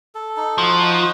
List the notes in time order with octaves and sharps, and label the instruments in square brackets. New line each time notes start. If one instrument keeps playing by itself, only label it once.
[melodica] A4
D#4
[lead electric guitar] F3 [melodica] F#4
[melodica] D#4